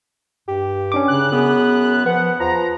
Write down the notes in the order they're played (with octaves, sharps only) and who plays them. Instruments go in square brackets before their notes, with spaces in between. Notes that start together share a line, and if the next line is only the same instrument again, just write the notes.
[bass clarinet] G2 [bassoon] G4
[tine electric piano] C#4 D4 D6
[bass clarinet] C#3 [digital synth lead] F#6
[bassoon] F#2 [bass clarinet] B3 [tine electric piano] G#4
[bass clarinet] F3 [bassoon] B3 [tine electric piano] B4 [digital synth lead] F#5
[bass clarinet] E2 [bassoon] F3 [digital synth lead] A#5